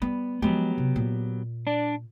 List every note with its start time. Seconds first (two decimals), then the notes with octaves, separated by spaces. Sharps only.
0.02 G3 B3
0.42 F3 F#3 G#3 B3 G4
0.78 C3
0.96 A#2
1.67 D4 D5